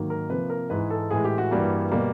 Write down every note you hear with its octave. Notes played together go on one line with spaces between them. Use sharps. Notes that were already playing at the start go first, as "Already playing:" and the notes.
Already playing: G#2 D#3 F#3 A#3
A#4
C3 F3 A#3 B4
A#4
G#2 E3 G#3 B4
A4
A2 E3 G#3 G#4
G4
F#4
G2 E3 G3 A#3
B2 G3 A#3